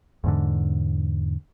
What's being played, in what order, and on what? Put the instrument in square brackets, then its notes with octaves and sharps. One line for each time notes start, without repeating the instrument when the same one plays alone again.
[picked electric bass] E2 G#2 D3